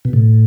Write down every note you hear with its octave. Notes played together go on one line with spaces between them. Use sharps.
B2
A2